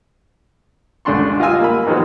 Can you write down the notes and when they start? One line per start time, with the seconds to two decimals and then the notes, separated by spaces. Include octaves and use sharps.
1.05 C#2 D3 D4 C6 C#6
1.40 F4 D#5 F5 G#5 E6
1.60 A#3 B5
1.87 B2 D#3 F3 G#3 F#4